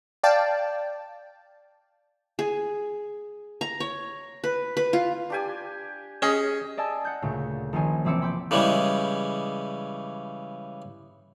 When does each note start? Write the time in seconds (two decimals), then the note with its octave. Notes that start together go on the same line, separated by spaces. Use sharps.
0.23 D5 F5 G5 A5
2.39 G#4
3.61 A#5
3.80 C#5
4.44 B4
4.77 B4
4.93 F4
5.30 D4 G4 G#5
6.22 C#4 G#4 D#5 D#6
6.77 D5 D#5 G#5 A5 E6 A6
7.05 F#5 F#6 G6
7.22 D2 A#2 C#3
7.73 A#1 D#3 C#4 C5 G#5
8.05 F1 E3 C4 D6 E6 C#7
8.21 G5 B5 C6 D6 G6
8.51 C#3 E3 G3 G#3